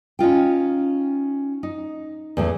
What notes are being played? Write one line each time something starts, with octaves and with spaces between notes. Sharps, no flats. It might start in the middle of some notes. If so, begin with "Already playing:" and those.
C#4 D#4 F4 G5
D#4
E2 A2 A3